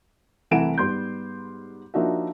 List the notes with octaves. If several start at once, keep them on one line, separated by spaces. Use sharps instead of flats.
C2 E3 A3 F#5 D7 E7
G#2 G3 B3 C6 G6
F3 A#3 D4 D#4 F#4 E5